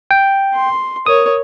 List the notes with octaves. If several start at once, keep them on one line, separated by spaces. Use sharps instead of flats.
G5
C6
A#4 C#5 D#6